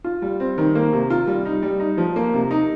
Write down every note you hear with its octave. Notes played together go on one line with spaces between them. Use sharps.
F4
G3
C4
D#3
A#3
C3
F4
G3
D#4
G3
D#4
F3
A#3
C3
D#4